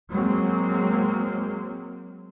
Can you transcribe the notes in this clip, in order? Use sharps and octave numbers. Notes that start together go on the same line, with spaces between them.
F#3 G#3 A#3 C4